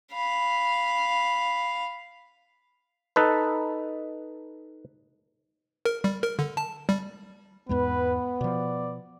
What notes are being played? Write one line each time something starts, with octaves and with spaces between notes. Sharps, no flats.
F5 B5
D#4 A4 B4
A#4
G3
A#4
D3
A5
G3
E2 G#2 G#3 B3 B4
B2 F3 D5